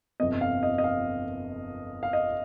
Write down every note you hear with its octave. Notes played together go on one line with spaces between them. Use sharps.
G1 F2 C3 D#5
F5
D#5
D#5
F5
F5
D#5